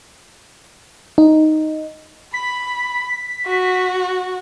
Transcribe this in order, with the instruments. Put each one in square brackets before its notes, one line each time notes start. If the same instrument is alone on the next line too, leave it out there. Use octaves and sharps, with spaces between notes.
[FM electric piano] D#4
[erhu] B5 [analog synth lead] B6
[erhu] F#4